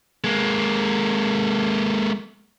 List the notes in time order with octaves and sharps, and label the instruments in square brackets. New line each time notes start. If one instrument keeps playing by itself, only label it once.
[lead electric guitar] G#3 A#3